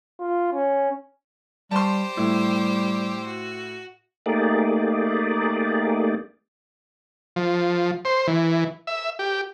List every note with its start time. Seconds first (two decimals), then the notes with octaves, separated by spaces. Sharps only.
0.20 F4
0.53 C#4
1.71 G3 G4 C5 A5 C6
2.17 A2 G3 E4
3.26 F#4
4.26 A3 A#3 D#4 G4 G#4 D5
7.36 F3
8.05 C5
8.27 E3
8.87 E5
9.19 G4